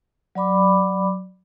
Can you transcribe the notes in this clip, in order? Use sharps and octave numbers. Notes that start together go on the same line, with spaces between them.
F#3 D5 B5 D6